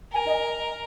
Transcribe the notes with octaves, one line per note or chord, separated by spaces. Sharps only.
A#4 G#5
D#5